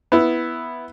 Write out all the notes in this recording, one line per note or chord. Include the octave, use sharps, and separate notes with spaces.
B3 E4